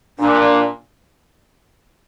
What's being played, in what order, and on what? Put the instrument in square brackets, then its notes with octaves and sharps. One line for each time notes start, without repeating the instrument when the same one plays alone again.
[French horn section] A#2 [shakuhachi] D4